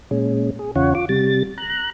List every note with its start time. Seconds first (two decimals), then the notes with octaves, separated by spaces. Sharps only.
0.11 A#2 G#3 C#4
0.59 G#4
0.76 E2 C#3 C#4 F4 C#5 F#5
0.95 F4 D6
1.09 C3 G3 A6
1.58 A#5 F#6